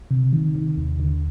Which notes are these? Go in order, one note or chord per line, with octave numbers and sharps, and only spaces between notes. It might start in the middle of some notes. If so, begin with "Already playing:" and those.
C3
D#3
D#3
D#2
D3